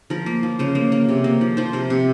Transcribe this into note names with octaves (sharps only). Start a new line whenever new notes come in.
F3 A#4
A#3
F3
C#3 C5
A#3
A#3
C3
A#3
F3
F3 C5
C3 A#4
C3